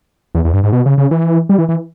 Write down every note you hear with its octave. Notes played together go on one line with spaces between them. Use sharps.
E2
E2
G2
G#2
B2
C#3
C#3
E3
G3
E3
E3